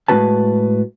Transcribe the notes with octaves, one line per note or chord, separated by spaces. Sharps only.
A2 G#3 C#4 F#4 B4 A5